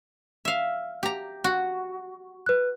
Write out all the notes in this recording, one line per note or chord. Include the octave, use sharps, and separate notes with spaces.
E5 F5
G4 A#5
F#4
B4 F#6